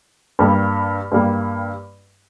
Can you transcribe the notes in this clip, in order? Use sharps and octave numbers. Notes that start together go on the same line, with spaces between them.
G2 G3 A#3
G2 G3 A#3